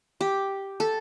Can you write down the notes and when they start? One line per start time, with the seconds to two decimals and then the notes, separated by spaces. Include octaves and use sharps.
0.21 G4
0.80 A4